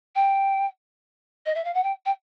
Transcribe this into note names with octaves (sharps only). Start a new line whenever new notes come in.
G5
D#5
E5
F5
F#5
G5
G5